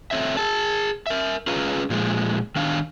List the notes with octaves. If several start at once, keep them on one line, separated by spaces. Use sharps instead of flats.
A3 C4 C#5 E5
G#4 A5
A#4 E5
C#4 F4 G#4 B4 F5 A#5
A#2 F3 G#3
D#3 D4 F5